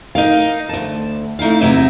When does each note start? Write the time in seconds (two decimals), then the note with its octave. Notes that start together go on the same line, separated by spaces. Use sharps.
0.15 D#4 A#4 F5
0.69 D2 A5
1.39 A3 D#4 E4 F5
1.61 E2 C3 F#3 D#4 E5